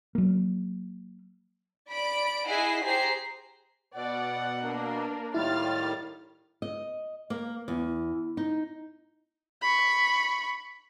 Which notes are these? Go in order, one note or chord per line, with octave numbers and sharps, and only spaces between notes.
F#3 A#3
D5 B5 D7
E4 G#4 D#5 F#5 B6 C7
G4 G#4 C5 A#5 C7
B2 D5 F#5
A#3 D4 A#4
A2 D#3 G3 E4 F4 F6 A6
D#5
A#3
E2
D#4
B5 C#6